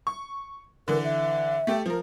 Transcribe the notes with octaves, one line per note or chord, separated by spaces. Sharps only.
C#6
D3 E3 A#4
E5
A3 G4 A4
F3 A#4